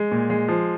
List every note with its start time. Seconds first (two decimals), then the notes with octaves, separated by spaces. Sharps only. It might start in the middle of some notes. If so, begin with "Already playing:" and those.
Already playing: G#3
0.11 A#2
0.30 G#3
0.48 F3